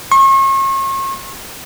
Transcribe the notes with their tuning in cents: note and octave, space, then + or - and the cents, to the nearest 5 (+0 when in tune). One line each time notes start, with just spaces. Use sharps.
C#6 -40